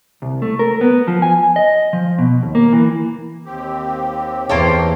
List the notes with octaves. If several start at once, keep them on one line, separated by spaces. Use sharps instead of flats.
C2
A3
A#4
B3
F3
G#5
D#5
F3
B2
D#2
A#3
E3
D#2 C4 G4
E2 A#3 C5 C#5 F5 A5 C6